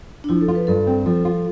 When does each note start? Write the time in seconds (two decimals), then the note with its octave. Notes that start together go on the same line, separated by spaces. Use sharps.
0.24 D4
0.29 F3 E4
0.41 A4
0.48 F4
0.55 B4
0.67 G2 A4
0.87 C4
1.06 F3 A4
1.25 F4